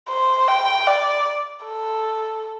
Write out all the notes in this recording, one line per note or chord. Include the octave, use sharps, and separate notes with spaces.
C5
G5
D5
A4